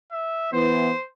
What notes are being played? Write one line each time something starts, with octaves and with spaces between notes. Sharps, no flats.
E5
E3 B3 C5